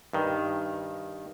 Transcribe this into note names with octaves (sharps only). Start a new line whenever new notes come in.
G2 D#3